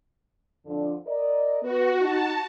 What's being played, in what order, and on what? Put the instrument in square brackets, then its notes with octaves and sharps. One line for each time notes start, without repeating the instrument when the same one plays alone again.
[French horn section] F2 D3 D4
A#4 D5 D#5
[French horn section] B3 B4 [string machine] F#4
[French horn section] D#4 [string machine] A5